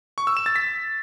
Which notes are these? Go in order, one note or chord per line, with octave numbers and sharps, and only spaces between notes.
C#6
E6
E7
A6
B6